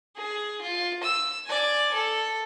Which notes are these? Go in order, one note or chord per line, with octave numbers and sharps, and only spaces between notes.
G#4
F4
E6
D5 G#5
A4